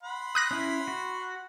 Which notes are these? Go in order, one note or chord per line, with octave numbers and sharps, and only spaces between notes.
F#5 B5 C6
D#6 F#6 A#6
C#4 E4
F#4